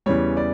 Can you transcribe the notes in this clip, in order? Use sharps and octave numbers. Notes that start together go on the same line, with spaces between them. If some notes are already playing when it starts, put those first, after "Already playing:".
E2 C#3 E3 G3 C#5
D5